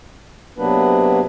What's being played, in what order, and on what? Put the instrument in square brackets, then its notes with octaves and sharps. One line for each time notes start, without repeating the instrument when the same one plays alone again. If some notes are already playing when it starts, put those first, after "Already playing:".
[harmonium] C3 F#3 A#3 B3 D4 B4